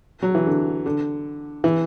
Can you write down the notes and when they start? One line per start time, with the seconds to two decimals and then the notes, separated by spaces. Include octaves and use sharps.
0.22 F#3
0.35 E3
0.46 D3
0.86 D3
1.64 E3